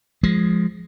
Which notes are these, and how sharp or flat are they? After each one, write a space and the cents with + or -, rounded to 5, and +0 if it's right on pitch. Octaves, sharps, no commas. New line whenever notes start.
F3 +0 G#3 +0